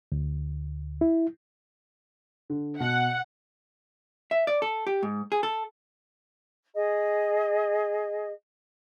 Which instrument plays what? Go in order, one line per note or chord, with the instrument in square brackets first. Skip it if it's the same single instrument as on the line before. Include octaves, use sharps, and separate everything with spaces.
[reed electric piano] D2
E4
[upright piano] D3
[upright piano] B2 [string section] F#5
[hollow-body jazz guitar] E5
D5
A4
G4
G#2
G#4
A4
[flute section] G#4 D#5